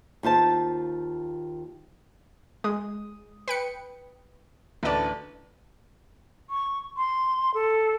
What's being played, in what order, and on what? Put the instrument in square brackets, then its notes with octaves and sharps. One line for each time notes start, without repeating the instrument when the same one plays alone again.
[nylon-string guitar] D#2 F4 C5 A5
[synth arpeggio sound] G#3 [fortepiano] D#6
[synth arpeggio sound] B4 G5 C#7
[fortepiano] A1 B4 A5 [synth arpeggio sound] D2 D5
[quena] C#6
C6
A4